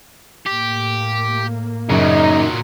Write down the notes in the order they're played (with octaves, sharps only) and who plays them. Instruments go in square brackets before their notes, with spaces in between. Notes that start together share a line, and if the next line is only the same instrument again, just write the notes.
[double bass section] A2 A#3 [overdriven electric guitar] G4
[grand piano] F#2 C#3 [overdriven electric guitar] A#2 F#3 [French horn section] D#4